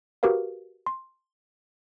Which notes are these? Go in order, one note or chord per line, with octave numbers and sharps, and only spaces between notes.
F#4 G4 A#4 B4 F5
C6